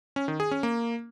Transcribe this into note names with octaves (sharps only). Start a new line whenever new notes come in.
C#4
D#3
G#4
C#4
A#3